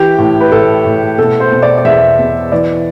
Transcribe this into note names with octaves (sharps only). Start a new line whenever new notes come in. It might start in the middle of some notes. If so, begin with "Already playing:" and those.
Already playing: E3 G4
A2
B4
A2 A4
A2
B2 A4
C5
B2
D5
D5
E2 E5
B2
E3 D5